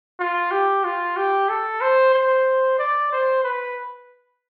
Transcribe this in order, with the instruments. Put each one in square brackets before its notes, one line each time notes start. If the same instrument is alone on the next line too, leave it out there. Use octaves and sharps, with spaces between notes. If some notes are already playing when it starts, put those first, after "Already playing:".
[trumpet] F4
G4
F4
G4
A4
C5
C5
D5
C5
B4